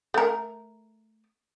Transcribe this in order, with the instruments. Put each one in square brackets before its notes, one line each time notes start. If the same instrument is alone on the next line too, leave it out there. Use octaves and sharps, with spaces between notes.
[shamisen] A3 A#4